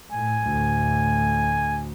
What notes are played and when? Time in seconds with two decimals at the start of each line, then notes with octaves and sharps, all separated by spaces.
0.13 A2 G#5
0.46 D2 A2